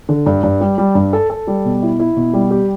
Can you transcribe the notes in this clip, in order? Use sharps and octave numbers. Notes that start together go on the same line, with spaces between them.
D3
G2
G2
G3
G3
G2
A4
A4
G3
B2
E4
E4
B2
G3
G4